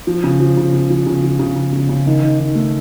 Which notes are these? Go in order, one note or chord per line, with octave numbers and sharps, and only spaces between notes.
F3
C#3
F3
C#3
C#3
F3
C#3
F3
C#3
C#3
C#3
C#3
D#3
D#3
D#3
A3